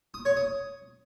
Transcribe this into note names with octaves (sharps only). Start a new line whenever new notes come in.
D#6
C#5
D#6